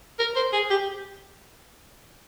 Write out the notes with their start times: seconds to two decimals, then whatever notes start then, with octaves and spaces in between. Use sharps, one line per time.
0.19 A#4
0.36 C5
0.53 G#4
0.70 G4